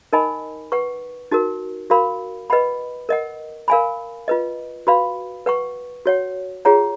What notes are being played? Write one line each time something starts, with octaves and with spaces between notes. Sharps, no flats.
D#4 A#4 D#5 G#5 B5
B4 F#5 C#6
D#4 F#4 A#4
F#4 A#4 F5 B5
B4 D#5 F#5 B5
A#4 D#5 F#5
A#4 F5 G#5 B5
F4 B4 D#5
F#4 B4 F5 B5
B4 F#5 C#6
F#4 C#5 F#5
F4 G#4 C#5 F#5 A#5